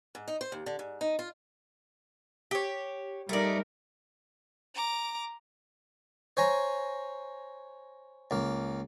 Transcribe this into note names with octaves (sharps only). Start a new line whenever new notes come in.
G#2
D#4
C5
D#2
D3
G#2
D#4
F4
G4 C#5
G3 A3 D#4 A#4 D5
A#5 D6
C5 C#5 G#5 A#5
C#2 A#3